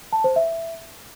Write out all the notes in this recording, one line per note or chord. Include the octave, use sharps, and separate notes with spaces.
A5
C5
E5